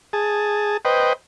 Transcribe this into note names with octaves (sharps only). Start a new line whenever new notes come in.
G#4 A5
B4 C5 D#5 G5